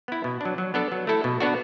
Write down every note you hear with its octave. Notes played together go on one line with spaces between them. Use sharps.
B3 E4
B2
F#3 D4
F#3
B3 D4 A4
F#3
A3 E4 A4
B2
B3 D4 F#4